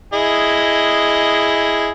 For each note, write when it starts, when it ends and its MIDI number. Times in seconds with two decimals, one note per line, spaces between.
0.13 1.90 64
0.13 1.90 68
0.13 1.90 75